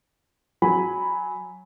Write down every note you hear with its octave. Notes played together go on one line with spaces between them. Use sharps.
F#3 G#5 B5